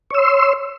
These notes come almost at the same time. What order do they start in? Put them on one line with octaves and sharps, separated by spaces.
C#5 E6 C6